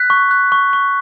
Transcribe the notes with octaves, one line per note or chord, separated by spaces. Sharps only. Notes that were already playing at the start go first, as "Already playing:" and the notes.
Already playing: F#6 B6
C#6
F#6
C#6
C#6